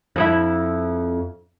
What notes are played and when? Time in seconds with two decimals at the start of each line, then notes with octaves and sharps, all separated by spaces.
0.16 F2 E4 E5